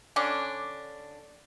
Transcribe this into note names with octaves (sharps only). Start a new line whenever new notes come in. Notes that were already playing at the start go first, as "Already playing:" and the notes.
D3 C#4 D4